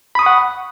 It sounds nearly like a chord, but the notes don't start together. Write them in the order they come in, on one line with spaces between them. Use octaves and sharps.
B5 D#6 C#6 F#5